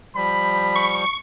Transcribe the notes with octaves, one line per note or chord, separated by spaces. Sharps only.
F3 G3 B5
C#6